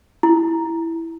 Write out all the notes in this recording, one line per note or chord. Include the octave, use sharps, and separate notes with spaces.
E4